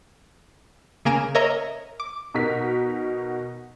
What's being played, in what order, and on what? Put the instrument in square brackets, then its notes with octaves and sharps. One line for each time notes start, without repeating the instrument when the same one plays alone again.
[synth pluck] C#3 A#3 G#5 A#5 D7 E7
A#4 C#5 D#5 E5 A#5
D6
[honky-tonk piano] B2 D#4 F#4 A#4 B6